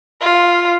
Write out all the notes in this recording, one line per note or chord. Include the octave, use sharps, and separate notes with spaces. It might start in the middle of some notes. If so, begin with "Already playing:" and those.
F4